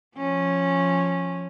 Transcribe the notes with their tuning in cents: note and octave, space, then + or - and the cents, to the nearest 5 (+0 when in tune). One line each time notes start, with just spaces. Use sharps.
F3 +0 C#4 -10